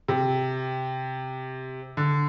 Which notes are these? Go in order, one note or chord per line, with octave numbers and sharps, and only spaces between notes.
C3
D3